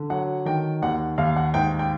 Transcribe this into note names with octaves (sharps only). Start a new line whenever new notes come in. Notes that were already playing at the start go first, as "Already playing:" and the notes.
Already playing: D3
F#3 F#5
D#3 G5
D#2 F#5
D#2 F5
F#5
G#2 G5
G5